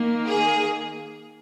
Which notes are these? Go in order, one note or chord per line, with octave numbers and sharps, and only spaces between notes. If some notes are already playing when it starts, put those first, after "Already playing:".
Already playing: D#3 A#3
G#4